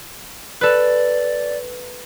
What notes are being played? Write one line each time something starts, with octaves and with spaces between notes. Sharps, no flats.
A4 B4 D5